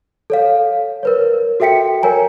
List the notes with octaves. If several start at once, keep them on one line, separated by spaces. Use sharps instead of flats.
A4 C#5 F5
A#4 B4 C#5
F#4 A4 E5 G5 B6 C#7
A#4 C#5 G#5 A#5